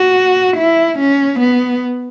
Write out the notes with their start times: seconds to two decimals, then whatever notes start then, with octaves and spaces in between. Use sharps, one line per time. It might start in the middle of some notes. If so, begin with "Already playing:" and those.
Already playing: F#4
0.57 E4
0.99 C#4
1.40 B3